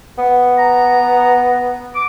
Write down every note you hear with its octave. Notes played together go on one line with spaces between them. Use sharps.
B3
A#5
D6